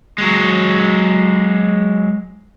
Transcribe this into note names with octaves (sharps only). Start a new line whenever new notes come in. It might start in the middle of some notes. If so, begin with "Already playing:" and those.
F#3 G#3